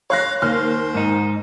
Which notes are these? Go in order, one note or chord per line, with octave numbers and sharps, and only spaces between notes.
C#5 F5 F#6 A#6
D#2 C5 F6
G#2 D#4